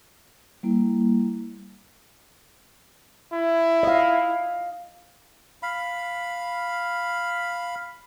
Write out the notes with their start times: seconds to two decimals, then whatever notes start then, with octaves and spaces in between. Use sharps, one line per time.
0.63 G3 A#3 E4
3.33 E4
3.83 D#5 F5
5.63 F5 B5